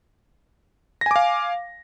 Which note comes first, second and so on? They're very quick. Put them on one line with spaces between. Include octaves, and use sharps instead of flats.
A#6 G#5 D6 F5